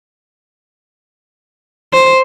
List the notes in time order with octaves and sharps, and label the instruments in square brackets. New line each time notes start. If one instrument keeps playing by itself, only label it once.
[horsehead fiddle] C5